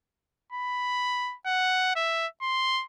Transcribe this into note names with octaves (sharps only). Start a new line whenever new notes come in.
B5
F#5
E5
C6